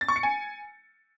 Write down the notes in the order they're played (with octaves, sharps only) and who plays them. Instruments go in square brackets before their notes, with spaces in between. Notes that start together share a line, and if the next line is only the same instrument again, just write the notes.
[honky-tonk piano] A6
C#6
C#7
G#5